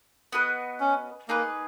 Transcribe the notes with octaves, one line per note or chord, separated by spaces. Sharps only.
B3 F#4 B4 D#5
C#4
A#3 D#4 G#4 B4